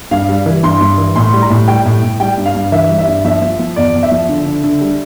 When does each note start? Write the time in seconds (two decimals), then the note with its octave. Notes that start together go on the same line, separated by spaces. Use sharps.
0.11 G2 F5
0.29 G3
0.46 E3
0.63 G2 C6
0.81 G2
0.98 E3
1.16 A2 C6
1.33 G3
1.42 A#5
1.50 A2
1.68 G3 G5
1.85 A2
2.03 A2
2.20 G3 G5
2.38 G2
2.46 F5
2.55 G2
2.72 E3 E5
2.90 G3
2.98 E5
3.07 G2
3.25 F3 E5
3.42 F3
3.59 F3
3.76 E2 D5
3.94 E2
4.03 E5
4.11 F3
4.29 D3
4.46 D3
4.63 D3
4.81 G3